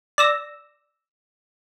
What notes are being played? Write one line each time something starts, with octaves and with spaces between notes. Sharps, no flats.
D5 E6 A#6